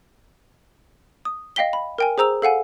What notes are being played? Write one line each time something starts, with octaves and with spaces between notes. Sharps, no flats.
D#6
D#5 F5 G5 B6 G7
B5
A#4 G5 G#5
G#4 C5 A#5 E6 F7
A4 F5 F#5 G#5